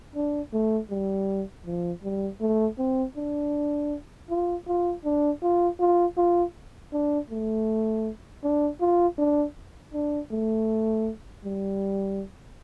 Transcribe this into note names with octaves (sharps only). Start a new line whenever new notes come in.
D4
A3
G3
F3
G3
A3
C4
D4
F4
F4
D4
F4
F4
F4
D4
A3
D4
F4
D4
D4
A3
G3